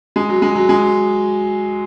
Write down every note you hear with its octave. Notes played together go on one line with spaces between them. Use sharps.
G#3
F#3
G#3
F#3
G#3